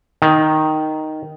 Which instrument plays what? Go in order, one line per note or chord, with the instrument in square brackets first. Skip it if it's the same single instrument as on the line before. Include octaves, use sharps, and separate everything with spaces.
[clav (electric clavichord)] D#3